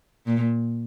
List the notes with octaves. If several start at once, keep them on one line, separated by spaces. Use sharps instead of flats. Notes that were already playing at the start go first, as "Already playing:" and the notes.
A#2